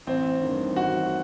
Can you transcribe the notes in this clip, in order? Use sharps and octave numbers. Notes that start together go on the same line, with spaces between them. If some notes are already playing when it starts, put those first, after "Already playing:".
A1 C4
G2 D#3
A1 F#4